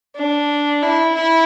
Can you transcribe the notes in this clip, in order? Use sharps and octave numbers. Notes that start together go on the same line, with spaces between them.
D4
E4
E4